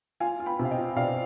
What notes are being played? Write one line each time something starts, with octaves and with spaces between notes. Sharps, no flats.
F4 F5 G#5
F4
G5 B5
C3
F5
D#5 G5
F4
C3 D5 F5